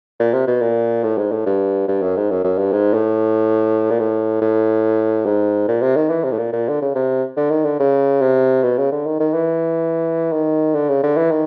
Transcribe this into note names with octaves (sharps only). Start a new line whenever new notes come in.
A#2
C3
B2
A#2
A2
G#2
A2
G2
G2
F#2
G#2
F#2
F#2
G2
G#2
A2
A#2
A2
A2
G#2
A#2
C3
D#3
E3
C3
A2
A#2
A#2
D3
C#3
C3
D3
D#3
D3
C#3
C3
B2
C#3
D3
D#3
D#3
E3
D#3
D3
C#3
D3
E3
D#3